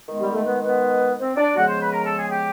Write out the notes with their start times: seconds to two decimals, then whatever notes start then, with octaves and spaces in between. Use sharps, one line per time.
0.08 D#3 G#3 B3
0.20 G3 G4
0.32 A3 A4
0.45 B3 B4
0.63 B3 B4
1.19 C4 C5
1.37 D4 D5
1.55 C#3 F3 G#3 B3 F#4 F#5
1.68 C5 C6
1.81 B4 B5
1.92 A#4 A#5
2.05 A4 A5
2.17 G#4 G#5
2.29 G4 G5